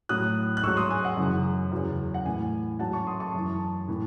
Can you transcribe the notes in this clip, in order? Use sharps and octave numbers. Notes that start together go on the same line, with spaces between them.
A2 F#3 D#6 F#6
F#6
G#2 F#3 C#6 E6
C6 D#6
G#5
F#5
F#2 C#3 E3
E2 C#3 F#3
F#5
A2 E3 G#5
G#2 F#3 F#5 A5
A5 C#6
C6 D#6
A5 C#6
F#2 E3
A2 E3